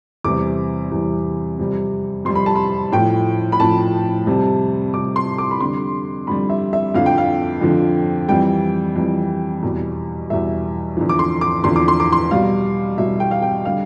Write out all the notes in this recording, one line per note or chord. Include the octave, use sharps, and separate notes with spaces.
E2 C3 E3 G3 D6
E2 C3 E3 G3
F2 C3 G3
F2 C3 G3 C6
B5
A5
B5
A2 F3 G5
B5
A2 F3 A5
F2 C3 G3
F2 C3 G3 D6
C6
D6
B5
F2 D3 G3 C6
F2 D3 G3 B5
E5
E5
F2 D3 F3 F5
G5
F5
F2 D3 F3
F2 E3 G3 G5
F2 E3 G3
E2 B2 G3
E2 B2 G3 E5
E2 D3 F3
D6
C6
D6
E2 D3 F3 C6
D6
C6
D6
C6
B2 G3 F5
B2 G3 E5
G5
F5
G5
D3 G3 F5